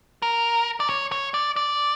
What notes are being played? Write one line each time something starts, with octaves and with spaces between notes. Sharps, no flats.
A#4
D5
C#5
C#5
D5
D5